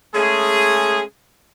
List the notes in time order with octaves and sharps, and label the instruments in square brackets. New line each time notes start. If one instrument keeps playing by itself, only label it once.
[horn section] G#3 A3 C#4 G#4